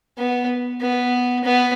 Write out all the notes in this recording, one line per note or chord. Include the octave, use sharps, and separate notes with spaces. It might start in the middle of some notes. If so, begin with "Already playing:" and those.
B3
B3
B3